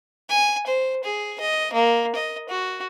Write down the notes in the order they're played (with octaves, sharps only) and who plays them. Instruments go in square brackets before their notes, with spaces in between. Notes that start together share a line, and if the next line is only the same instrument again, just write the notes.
[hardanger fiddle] G#5
C5
G#4
D#5
A#3
D#5
F#4